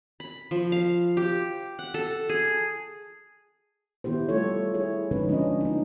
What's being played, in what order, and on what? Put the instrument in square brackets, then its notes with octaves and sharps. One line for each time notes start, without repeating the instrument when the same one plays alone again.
[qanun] B5
F3
F5
G4
F#5
A4
G#4
[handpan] D#3 B3 E4 G4 C5
G3 A3 F4 A4 C#5
E4 G#4 C#5
D3 F3 G#3 C#4 D#4 B4
C#4 D4 F4 D#5
A#3 D#4